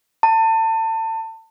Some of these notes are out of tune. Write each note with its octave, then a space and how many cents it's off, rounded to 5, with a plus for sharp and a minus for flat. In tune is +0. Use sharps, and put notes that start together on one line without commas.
A5 +30